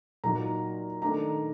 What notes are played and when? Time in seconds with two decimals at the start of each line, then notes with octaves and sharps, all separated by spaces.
0.24 A#2 F#3 A#3 D#4 A#5
1.02 D#3 A3 D4 A#5